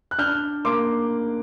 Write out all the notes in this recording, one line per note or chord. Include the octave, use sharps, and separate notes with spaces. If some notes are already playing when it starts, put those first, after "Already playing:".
F#6
D4 F6 G6
A#3 C6 D6